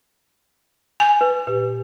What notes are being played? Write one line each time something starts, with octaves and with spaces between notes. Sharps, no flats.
G#5 G6
B4
A#2 G4 B4